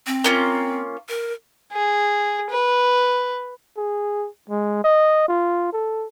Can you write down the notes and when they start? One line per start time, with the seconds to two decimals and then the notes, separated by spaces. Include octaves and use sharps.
0.07 C4
0.24 A#3 C#4 F4
1.09 A#4
1.72 G#4
2.50 B4
3.77 G#4
4.50 G#3
4.84 D#5
5.28 F4
5.73 A4